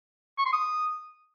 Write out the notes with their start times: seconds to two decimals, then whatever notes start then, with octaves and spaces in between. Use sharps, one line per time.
0.39 C#6
0.46 C6
0.53 D#6